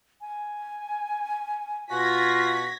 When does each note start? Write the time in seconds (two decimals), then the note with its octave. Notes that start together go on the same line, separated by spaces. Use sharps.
0.21 G#5
1.91 B2 F4 F#4 G#6 A#6 B6